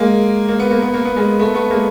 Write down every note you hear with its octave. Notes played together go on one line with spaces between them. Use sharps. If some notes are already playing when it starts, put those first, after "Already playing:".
Already playing: G#3 A#3
A#3
B3
A#3
B3
A#3
B3
G#3 A#3
A3 B3
A3 B3
G#3 A#3